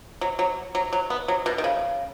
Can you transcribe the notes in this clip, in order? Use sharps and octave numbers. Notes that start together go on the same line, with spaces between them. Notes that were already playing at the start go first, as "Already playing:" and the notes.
F#3
F#3
F#3
F#3
B3
F#3
B2
D#3
C#3